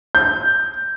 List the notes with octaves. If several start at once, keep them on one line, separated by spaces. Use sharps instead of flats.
G6